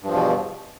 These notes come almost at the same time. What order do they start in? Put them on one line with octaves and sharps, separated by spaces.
G2 F3 E2 B2